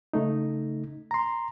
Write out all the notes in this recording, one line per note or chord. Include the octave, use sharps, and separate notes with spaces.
C#3 A3 D#4
A#5 C6